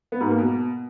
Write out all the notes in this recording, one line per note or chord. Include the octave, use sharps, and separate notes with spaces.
B3
G#2
A#3
B2